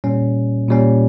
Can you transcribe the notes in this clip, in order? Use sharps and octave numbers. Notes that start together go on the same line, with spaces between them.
A#2 G3 C#4
A#2 G3 C#4